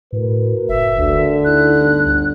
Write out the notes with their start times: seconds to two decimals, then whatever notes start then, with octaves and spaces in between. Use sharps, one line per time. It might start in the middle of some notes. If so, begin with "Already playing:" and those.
0.12 A2 F#4 A#4 B4
0.69 F#1 E5
0.99 D2 D3 F#4
1.45 D#4 E4 F#6
1.78 G1